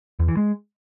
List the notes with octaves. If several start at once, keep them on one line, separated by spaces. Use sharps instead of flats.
E2
E3
G#3